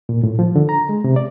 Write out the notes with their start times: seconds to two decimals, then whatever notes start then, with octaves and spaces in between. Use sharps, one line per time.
0.09 A#2
0.24 A2
0.39 F3
0.56 D3
0.69 A#5
0.89 G#3
1.04 C3
1.16 D5